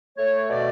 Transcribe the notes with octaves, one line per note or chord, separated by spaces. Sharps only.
A3 C#5
B2 D5